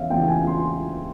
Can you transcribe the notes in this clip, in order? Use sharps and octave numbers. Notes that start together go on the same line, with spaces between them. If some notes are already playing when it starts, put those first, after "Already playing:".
Already playing: E2 C#3 E3 C#5 E5 F5
E2 C#3 E3 G5
G#5
C6